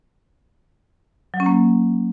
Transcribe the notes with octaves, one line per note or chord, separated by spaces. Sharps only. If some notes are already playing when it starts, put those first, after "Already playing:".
F#3
C#4
A#3